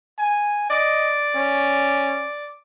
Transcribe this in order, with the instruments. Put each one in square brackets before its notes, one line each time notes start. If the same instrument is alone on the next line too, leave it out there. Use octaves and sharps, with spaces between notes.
[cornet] G#5
[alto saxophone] D5 [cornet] D#5
[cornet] C#4